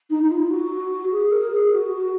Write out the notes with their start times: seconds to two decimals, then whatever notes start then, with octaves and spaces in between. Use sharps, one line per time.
0.10 D#4
0.23 D#4
0.31 F4
0.51 F#4
1.11 G#4
1.31 A#4
1.51 G#4
1.72 F#4
1.92 F#4